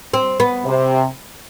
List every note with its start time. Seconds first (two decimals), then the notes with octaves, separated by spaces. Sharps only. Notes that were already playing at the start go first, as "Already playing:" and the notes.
0.14 C4
0.40 B3
0.66 C3